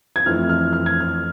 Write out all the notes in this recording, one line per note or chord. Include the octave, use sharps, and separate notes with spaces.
G#6
F2 E3 A3 C4 F6
F6
F6
G#6
F6